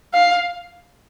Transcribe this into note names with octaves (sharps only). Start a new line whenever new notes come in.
F5